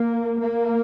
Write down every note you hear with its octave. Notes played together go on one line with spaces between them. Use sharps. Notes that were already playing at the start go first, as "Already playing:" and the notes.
Already playing: A#3
A#3